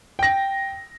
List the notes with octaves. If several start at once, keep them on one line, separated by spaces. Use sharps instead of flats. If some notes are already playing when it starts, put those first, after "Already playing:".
G5 A#6